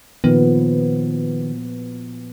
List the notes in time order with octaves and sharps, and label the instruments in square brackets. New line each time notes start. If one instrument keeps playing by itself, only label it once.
[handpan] A#2 F3 B3 [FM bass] D#3